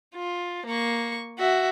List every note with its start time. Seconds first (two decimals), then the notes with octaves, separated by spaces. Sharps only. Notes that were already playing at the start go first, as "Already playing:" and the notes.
0.15 F4
0.66 A#3 C#6
1.39 F#4 E5